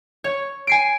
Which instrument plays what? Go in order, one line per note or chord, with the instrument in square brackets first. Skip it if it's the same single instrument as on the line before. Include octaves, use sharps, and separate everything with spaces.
[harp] C#5
G#5 C7 D7